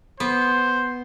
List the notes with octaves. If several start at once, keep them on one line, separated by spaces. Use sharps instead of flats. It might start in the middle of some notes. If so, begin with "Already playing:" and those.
B3 C5